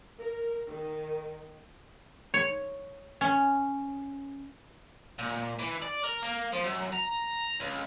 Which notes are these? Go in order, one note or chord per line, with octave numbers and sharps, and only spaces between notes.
A#4
D#3
C#5
C#4
A#2
E3
D5
A#4
A#3
F3
F#2
A#5
C#2